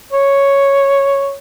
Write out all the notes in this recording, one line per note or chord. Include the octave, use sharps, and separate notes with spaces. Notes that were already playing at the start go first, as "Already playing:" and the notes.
C#5